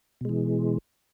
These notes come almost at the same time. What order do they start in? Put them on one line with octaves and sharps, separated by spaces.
B2 G#3 E3